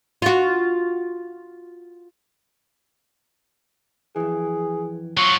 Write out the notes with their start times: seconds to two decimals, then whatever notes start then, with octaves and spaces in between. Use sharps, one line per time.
0.22 F4 F#4
4.16 F2 E3 G#4
5.17 F#3 F4 C#6